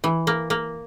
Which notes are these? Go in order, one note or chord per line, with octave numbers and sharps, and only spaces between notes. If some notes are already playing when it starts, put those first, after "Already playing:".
E3
A#3
A#3